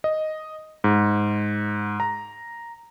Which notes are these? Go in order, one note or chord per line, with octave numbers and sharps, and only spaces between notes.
D#5
G#2
A#5